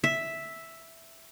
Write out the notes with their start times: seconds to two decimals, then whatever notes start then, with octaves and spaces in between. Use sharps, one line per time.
0.04 E5